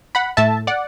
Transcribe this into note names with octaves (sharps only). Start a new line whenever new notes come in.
F#5 B5
A2 A3 E5 A5
D5 F#5